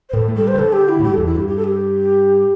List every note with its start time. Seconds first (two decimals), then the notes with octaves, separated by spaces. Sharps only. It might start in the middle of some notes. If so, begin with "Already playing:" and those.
0.09 C5
0.13 A2 A4
0.28 A3
0.36 G3 A4
0.48 C5
0.54 C3
0.58 D3 A4
0.73 G4
0.89 E4
1.00 A2
1.04 G2 G4
1.14 E2 A4
1.26 E4
1.33 G2 G4
1.48 G4
1.57 A4
1.64 G4